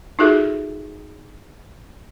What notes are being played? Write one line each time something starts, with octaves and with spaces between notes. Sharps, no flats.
D#4 F4 F#4 G#4 A4 E5